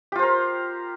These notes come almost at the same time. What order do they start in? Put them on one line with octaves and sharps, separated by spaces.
G4 F4 C5 A#4